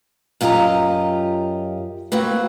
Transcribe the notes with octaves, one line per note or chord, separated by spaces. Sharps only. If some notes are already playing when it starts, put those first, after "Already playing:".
F#2 F4 G4 D#5 A#5
A#3 C4 F#4 B4